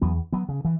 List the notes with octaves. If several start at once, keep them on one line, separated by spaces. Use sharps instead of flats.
E2 F#3 B3
F#3 B3
C#3
E3